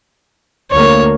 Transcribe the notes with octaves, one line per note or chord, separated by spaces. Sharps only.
D2 A#3 C#5